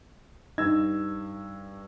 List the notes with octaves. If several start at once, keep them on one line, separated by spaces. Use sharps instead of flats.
G2 D#4 E6 G#6